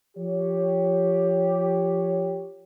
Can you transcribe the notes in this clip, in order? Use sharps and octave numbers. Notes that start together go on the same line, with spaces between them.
F3 G4 C#5